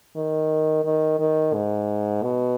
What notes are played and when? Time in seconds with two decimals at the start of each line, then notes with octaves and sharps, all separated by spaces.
0.16 D#3
0.85 D#3
1.20 D#3
1.54 G#2
2.23 B2